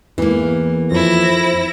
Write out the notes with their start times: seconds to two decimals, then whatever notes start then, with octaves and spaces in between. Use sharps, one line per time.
0.18 E2 E3 A#3
0.91 F2 E4 C5 A#6